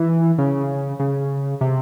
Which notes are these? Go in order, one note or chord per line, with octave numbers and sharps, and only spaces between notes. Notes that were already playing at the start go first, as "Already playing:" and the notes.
Already playing: E3
C#3
C#3
C3